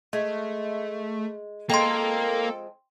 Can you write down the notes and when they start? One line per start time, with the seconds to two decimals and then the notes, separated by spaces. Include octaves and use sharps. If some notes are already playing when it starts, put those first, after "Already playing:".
0.13 G#3 A3
1.70 F3 G#3 A#3 C4 A4 G5 C6